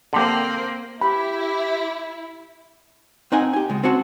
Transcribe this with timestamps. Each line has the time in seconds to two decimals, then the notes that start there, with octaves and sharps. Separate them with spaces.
0.13 D3 A#3 C4 G4
1.01 E4 G4 B5
3.32 C4 D#4 F#5 G#5
3.53 G4 G#5
3.70 C#2 G#3
3.84 C4 C#4 F#4 F#5 A5